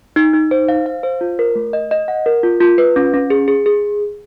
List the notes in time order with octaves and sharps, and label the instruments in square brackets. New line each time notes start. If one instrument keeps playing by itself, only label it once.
[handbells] D#4
D#4
C5
F5
F5
C5
F4
A#4
A3
D#5
D#5
F#5
A#4
F4
F4
B4
C#4
C#4
G#4
G#4
G#4